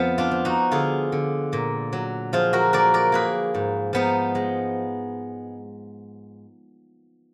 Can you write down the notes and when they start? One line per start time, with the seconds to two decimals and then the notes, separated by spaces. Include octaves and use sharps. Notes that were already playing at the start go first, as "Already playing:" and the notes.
Already playing: F2 F3 B3
0.18 D4 F4
0.31 F3
0.45 D#4 F#4
0.71 D3 F4 G#4
1.12 D3
1.53 A#2
1.93 F#3
2.33 F3 F4 G#4
2.53 F#4 A#4
2.73 A#3 A#4 D5
2.94 A#4 D5
3.12 A#3 G#4 B4
3.55 G#2
3.93 F3 B3 D#4
4.35 G#3